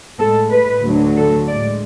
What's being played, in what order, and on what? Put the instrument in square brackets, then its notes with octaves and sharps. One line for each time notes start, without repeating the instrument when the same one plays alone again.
[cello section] A2 G#3 A4
B4
D2 D3 F#3 A3
A4
A2 G#3 D5